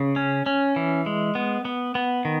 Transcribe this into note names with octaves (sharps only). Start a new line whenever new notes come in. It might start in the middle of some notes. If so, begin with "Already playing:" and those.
Already playing: C#3
C#4
C#4
E3
G#3
B3
B3
B3
D#3